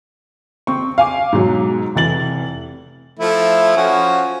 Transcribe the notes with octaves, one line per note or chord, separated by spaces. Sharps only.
C4 C#6
F5 G#5 D6
G#2 B2 F#3
F1 E3 A6 F#7
F3 A3 E4
F3 C#4 F#4